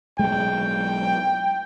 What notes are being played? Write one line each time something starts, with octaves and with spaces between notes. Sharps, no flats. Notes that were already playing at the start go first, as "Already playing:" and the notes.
B1 G#3 A3 G5